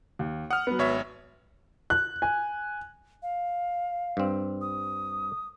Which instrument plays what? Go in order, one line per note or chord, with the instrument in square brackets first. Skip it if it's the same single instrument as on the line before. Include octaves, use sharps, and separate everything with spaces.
[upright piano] D#2
[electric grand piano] F#5 F6 [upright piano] D#6
[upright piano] F#3 B3
[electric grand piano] G#1 C#5 E5
[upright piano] F#6
G#5
[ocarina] F5
[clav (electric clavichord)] G2 C4
[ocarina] D#6